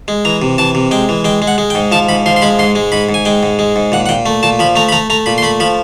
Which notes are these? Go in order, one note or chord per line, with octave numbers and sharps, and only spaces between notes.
G#3
E3 A#5
C3
E3 A5
C3
G#3 G5
E3
G#3 G5
G#3
F#5
G#3
G5
G#2
F3 A5
G#2 B5
F3 C6
C6
G#3 B5
G#2 C6
G#3
G#2 B5
G#2
G#5
G#3 G5
G#2
G#3
G#2
A#2 F#5
F#5
A#2 G5
A3
A#2 A5
F3 B5
A3 A#5
B5
A3 A#5
A3 A#5
A#2 B5
C6
A3 B5
F3 B5